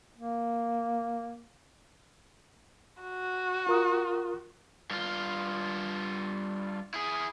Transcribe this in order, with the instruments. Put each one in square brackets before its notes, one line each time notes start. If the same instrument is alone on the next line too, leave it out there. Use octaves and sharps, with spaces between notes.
[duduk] A#3
[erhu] F#4
[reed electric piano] F4 A#4 D#6
[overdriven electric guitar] G2 F4
E4 G#4